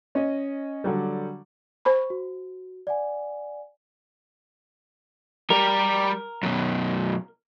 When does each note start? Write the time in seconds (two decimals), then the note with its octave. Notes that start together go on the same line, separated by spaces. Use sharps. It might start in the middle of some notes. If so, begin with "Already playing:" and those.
0.15 C#4 D#5
0.84 D3 F#3 G3
1.85 C5 B5 C#6
2.10 F#4
2.87 D5 F#5 G#5
5.50 G3 G4 A#4
6.43 F#2 B2